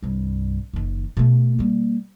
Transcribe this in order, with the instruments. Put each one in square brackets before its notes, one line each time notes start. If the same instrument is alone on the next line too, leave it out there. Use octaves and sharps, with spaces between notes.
[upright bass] C2 G2
F#1 D#3
B2 A3
G3 A#3